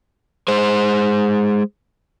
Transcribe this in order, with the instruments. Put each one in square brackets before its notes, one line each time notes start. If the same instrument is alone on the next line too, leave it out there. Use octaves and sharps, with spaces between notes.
[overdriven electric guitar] G#3 C5